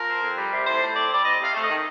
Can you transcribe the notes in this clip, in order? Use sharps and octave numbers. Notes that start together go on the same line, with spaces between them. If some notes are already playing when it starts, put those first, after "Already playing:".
Already playing: F3 A#4
C4
F2
G3
C3
A2 C5
A2
C4 D5
G3 D5
C4 D#5
C3 F5
A3
D#3 D#5